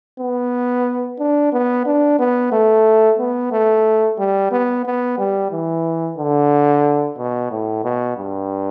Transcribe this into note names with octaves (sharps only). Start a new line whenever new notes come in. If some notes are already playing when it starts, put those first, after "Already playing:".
B3
D4
B3
D4
B3
A3
B3
A3
G3
B3
B3
G3
E3
D3
B2
A2
B2
G2